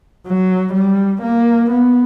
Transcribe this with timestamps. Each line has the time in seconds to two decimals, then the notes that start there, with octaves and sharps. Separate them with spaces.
0.27 F#3
0.74 G3
1.22 A#3
1.70 B3